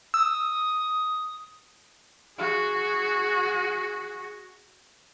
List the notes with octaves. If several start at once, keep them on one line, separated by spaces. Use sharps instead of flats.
D#6 E6
F#4 G#4